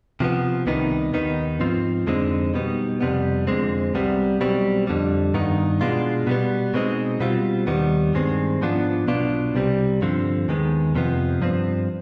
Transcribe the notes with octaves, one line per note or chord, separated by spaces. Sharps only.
C3 F3 B3
C2 C3 D#3 B3 D#4
D#2 D#3 B3 D#4
G#2 F3 C4 F4
F2 D3 G#3 C4 D#4
B2 G3 B3 D#4
F2 C3 G3 B3
F2 D3 G#3 C4
C2 C3 G3 B3
B1 B2 G3 C4
F2 D3 G3
G2 D#3 B3 D#4
B2 G#3 D4 F4
B2 G3 B3
B2 G#3 C4 D#4
B2 G3 C4 F4
D#2 D#3 G3 B3
G2 D#3 G#3 C4
G#2 F3 B3 D4 F4
B1 B2 B3 D4 F4
C2 C3 G3 C4
G2 D3 F3 C4
D#2 D#3 G#3 B3
F2 C3 F3 B3
G2 F3 C4